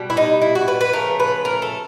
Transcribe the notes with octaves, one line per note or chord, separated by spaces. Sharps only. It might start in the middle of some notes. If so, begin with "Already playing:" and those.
Already playing: B2 G3
E4
D#4
E4
F#4
B4
B4
C#3 F3 A3 A#4
B4
A#4
A4